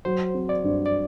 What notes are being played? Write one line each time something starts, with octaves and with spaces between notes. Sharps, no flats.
F#3 C5
C4
D5
G2
D5